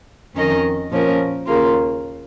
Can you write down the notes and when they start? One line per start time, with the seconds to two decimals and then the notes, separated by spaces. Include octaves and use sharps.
0.34 F2 D#3 C#4 A#4 D#5
0.91 A#2 F3 C#4 A#4
1.47 D#2 C#3 A#3 F4